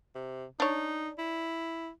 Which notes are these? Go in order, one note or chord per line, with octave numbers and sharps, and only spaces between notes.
C3
D4 D#4 C#5
E4